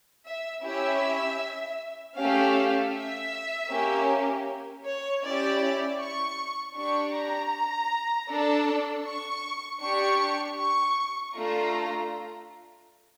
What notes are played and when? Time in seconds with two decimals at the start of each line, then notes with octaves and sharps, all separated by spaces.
0.25 E5
0.63 C#4 E4 G4 E5
2.16 A3 C#4 G4 F5
2.93 E5
3.70 A#3 C#4 G4
4.85 C#5
5.23 C#4 E4 G4 D5
5.99 C#6
6.76 D4 G4 C#6
7.14 A#5
8.28 D4 A4
9.05 C#6
9.82 D4 G4 C#6
10.58 C#6
11.35 A3 D4 F4 A#5